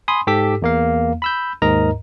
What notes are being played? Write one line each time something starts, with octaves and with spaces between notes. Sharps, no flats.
G#5 B5 C6 D#6
G#2 G4 A4 D6 E6 B6
E2 A#3 F5
B5 E6 G6
D#2 G#2 A#4 D#5 A#5